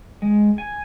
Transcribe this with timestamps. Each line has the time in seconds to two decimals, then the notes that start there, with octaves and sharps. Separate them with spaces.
0.22 G#3
0.58 G#5